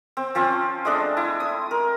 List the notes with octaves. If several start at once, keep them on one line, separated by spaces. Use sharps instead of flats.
C4
F3 C4 C#4
G#3 A3 D4 D#5
E4
D#6
A#4